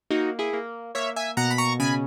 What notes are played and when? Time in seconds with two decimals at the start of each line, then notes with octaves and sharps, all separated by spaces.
0.10 A#3 D#4 F#4
0.39 E4 G#4
0.53 A#3
0.95 A#3 C#5 E5
1.16 E5 G#5
1.37 B2 F#5 A#5
1.51 B5
1.58 A#5 C#6
1.79 C#3 G#5 B5